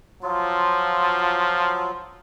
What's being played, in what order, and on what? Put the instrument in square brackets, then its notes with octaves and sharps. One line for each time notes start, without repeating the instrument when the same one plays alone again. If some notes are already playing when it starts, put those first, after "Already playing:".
[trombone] F3 [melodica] F#3 F4